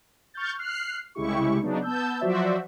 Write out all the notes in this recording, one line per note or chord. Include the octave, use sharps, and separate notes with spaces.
C#6 F6 G6 A6
F6 F#6 C7
C2 C#3 G#3 E4 G4 C#6
C#3 F#3 B3 D4 D#4
B3 A5 E6 G6
F3 F#3 F#4 C5 D5 E5